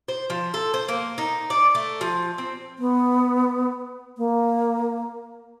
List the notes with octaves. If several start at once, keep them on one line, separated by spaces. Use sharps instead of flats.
C5
F3
A4
C5
A#3
D#4
D5
A3
F3
C4
B3
A#3